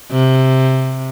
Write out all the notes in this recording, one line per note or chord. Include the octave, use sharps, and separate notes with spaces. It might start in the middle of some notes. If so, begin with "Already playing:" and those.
C3